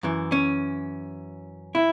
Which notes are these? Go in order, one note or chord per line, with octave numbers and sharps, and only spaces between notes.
F#2 E3
C#4
E4